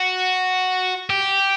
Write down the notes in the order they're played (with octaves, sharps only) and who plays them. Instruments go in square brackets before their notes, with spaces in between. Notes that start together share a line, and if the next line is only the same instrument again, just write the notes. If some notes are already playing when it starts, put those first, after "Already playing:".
Already playing: [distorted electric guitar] F#4
G4